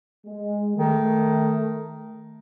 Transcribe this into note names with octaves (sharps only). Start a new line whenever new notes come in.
G#3
D#3 A3